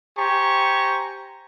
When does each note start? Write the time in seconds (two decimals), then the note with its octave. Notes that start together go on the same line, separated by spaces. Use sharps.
0.17 G4 C5 G#5 A#5 C#6